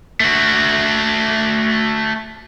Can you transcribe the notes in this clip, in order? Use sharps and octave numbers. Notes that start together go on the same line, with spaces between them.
A3 F#4